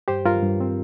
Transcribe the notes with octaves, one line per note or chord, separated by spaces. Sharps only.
G2 G4 C5
G2 F4 A#4
G2
C4